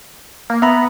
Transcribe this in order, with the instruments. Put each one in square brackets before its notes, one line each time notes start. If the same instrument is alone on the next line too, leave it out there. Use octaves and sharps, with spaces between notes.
[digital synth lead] A#3
[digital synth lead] B3 [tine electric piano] E5 A#5 B5